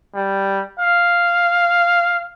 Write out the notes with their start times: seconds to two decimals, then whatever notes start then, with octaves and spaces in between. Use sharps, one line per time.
0.15 G3
0.80 F5